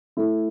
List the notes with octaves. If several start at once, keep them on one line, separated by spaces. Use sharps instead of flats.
A3 E4 A4